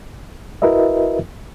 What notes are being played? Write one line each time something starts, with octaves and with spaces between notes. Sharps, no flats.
E4 F#4 A#4 B4 D#5 E5